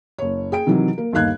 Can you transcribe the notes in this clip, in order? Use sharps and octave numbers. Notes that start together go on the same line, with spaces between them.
F#1 C#5
G#4 G5 D7
C3 D#3 E3 F#3
A#3
G1 D#2 D#4 F5 F#6 G#6